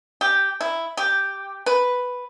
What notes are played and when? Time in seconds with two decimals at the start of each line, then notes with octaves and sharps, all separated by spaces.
0.21 G4
0.61 E4
0.97 G4
1.66 B4